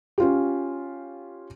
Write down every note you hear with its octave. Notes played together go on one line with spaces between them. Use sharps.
C#4 F4 G4